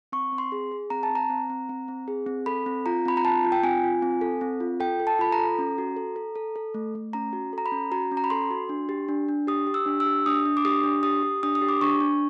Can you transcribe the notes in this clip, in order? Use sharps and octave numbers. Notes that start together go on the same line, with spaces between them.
C4 C#6
C4
C6
G#4
G#4
C4 A#5
A5
C4
A#5
C4
C4
C4
C4
G#4
C4
A4 B5
C4
F4 A#5
C4 B5
A#5
F4 A5
F4
G5
C4 G#5
F4
C4
A4
C4
F4
A4 G5
A4
A5
F4 B5
A#5
A4
C#4
F#4
A4
A4
A4
A4
A3
A3
C#4 A#5
F#4
A4 A#5
B5
C#4
F#4 A#5
C#4
A#5
B5
A4 C6
F#4
D4
G4
D4
D4
G4 D#6
G4
E6
D4
E6
G4
D4 D#6
D4
D6
G4 D#6
D4
G4 D#6
G4
D4 D#6
D#6
G4
D6
D4 C#6
D4